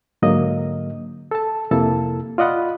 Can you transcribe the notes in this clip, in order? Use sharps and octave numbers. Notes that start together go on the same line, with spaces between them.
G#2 D3 F#3 A#3 D#5
A4 A5
F2 C3 A#3 E4 A4 A5
F4 D5 D#5 F#5 B5